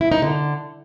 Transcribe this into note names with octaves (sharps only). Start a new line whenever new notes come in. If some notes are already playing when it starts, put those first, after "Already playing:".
E4
D#4
D3